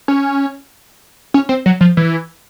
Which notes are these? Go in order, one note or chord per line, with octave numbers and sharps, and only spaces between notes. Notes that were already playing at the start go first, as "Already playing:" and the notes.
C#4
C#4
C4
F#3
F3
E3